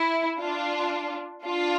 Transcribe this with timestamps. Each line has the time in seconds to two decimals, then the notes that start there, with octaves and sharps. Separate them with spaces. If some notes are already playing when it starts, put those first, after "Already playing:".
Already playing: E4
0.40 D4 F4
1.45 D4 F4